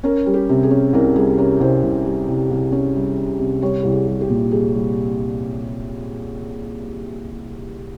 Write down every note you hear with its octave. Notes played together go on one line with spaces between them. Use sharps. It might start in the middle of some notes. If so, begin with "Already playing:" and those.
C#4 A#4
G3
G4
C3
G#4
C#4
C2 A#4
G3 G#4
C#4 A#4
C2 C5
C2
G3
C2
C2
C#4
G3
C#4
C3
G3 C#5
C2 G4
G#4
G3
G4
A#2
G3 G#4
G3